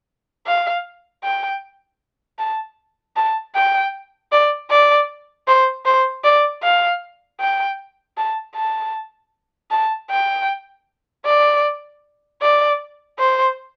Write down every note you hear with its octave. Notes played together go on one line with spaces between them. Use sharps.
F5
G5
A5
A5
G5
D5
D5
C5
C5
D5
F5
G5
A5
A5
A5
G5
D5
D5
C5